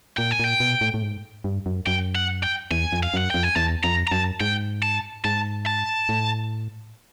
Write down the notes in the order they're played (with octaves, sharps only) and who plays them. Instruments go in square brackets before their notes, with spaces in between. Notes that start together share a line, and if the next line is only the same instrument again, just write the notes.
[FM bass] A#2 [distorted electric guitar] G5
[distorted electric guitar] G#5
[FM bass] A#2 [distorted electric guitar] G5
[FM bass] B2
A2
A2
G#2
G2
F#2
[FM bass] F#2 [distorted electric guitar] G5
[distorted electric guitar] F#5
G5
[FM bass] E2 [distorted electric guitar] G#5
[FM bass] F2
[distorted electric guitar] F5
[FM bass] F#2 [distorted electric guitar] F#5
[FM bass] F2 [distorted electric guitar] G5
[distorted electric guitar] G#5
[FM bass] E2 [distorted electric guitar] A5
[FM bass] F2 [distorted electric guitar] A#5
[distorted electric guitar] A#5
[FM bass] F#2 [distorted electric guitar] A5
[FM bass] G#2 [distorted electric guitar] G5
[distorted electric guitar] A5
[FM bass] G#2 [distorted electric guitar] A5
[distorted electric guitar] A5
[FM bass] A2